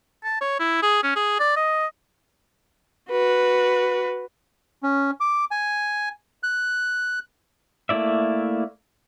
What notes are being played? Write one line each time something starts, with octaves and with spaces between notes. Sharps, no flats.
A5
C#5
E4
G#4
C#4
G#4
D5
D#5
F#4 B4
C#4
D6
G#5
F#6
A3 A#3 E4 D5 E5